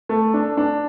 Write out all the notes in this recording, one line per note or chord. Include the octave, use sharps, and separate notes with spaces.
A3
D4
D4